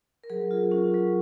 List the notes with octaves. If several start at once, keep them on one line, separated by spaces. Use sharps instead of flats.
A#4
F#3 G#4
F4
C#4
F#3